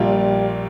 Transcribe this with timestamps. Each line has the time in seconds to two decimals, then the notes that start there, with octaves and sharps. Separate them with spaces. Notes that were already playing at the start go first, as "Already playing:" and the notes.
Already playing: A#1 A#2 G3 A#3 F4